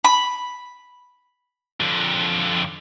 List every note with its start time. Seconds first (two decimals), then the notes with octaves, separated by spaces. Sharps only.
0.05 B5
1.81 F2 D3